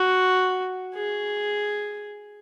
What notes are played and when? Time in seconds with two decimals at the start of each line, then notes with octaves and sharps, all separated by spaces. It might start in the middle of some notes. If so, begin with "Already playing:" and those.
Already playing: F#4
0.95 G#4